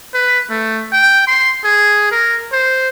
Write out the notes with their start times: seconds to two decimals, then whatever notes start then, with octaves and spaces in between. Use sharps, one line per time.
0.14 B4
0.50 A3
0.92 G5
1.28 C6
1.64 G#4
2.12 A#4
2.53 C5